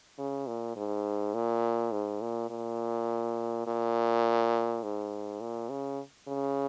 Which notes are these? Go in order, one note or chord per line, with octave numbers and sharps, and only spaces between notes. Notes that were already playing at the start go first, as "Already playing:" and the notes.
C#3
A#2
G#2
A#2
G#2
A#2
A#2
A#2
G#2
A#2
C#3
C#3